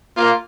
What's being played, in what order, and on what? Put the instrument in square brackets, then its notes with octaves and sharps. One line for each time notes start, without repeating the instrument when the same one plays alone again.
[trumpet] A#3 [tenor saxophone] F4